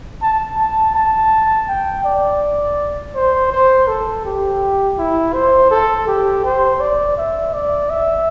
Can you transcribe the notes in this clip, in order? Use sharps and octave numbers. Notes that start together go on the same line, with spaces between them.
A5
A5
A5
G5
D5
C5
C5
A4
G4
E4
C5
A4
G4
C5
D5
E5
D5
E5